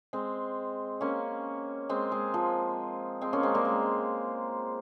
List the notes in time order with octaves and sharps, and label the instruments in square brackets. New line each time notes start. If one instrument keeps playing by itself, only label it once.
[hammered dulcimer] G#3 C4
A#3 C#4
G#3 C4
G#3
F3
G#3 C4
A#3 C#4
G#3 C4
G3 A#3
G#3